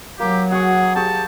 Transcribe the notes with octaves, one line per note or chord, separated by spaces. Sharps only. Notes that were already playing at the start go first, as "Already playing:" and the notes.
F#3 A#3 G4
F#4 G#4 F#5 C#6
G4 G#4 A5 C#6